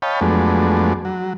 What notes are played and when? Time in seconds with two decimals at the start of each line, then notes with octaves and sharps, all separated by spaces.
0.02 C#5 D#5 F5 G5 A5 B5
0.21 F2 F#3 G#3 A3 B3 D4
1.05 F#3